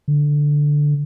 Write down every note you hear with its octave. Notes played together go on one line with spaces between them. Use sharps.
D3